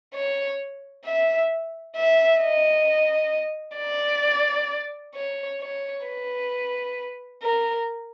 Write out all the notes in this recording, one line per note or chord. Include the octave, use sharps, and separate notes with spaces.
C#5
E5
E5
D#5
D5
C#5
C#5
B4
A#4